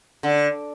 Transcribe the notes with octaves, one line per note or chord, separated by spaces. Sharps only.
D3